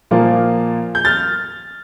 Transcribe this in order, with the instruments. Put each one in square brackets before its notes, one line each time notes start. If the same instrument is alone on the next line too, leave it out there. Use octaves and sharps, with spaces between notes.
[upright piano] A#2 F3 A#3 F4
G6
F6 A6